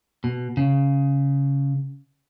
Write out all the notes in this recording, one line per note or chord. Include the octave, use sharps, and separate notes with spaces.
B2
C#3